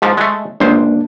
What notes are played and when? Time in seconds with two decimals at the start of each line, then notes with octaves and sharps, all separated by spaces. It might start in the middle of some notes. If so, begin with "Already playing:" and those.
0.02 G#2 F3
0.17 G#3 A3
0.60 G1 C#2 A#3 D4 C5